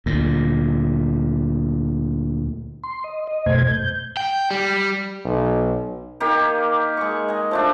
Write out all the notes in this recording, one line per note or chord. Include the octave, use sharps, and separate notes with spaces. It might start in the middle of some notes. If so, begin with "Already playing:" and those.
D2 A#2
C6
D#5
D#5
F#2 B2 A3 C5 G#6
G6
G5
G3
B1
D#3 A#3 G4
G#3 C#6
D#5 G#5
F3 A3 D4